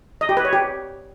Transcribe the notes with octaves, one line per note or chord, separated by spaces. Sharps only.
D#5
G4
B4
C#5
G4